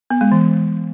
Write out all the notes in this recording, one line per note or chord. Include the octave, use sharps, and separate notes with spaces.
B3
G#3
E3